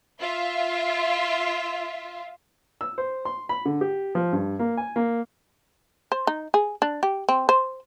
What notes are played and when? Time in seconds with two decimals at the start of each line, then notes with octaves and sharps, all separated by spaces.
0.20 F4 E5
2.81 E6
2.98 C5
3.25 C6
3.49 B5
3.65 D3
3.81 G4
4.15 F3
4.33 G2
4.59 A#3
4.77 G#5
4.96 A#3
6.12 C5
6.27 D#4
6.54 G#4
6.82 D4
7.03 G4
7.29 C4
7.49 C5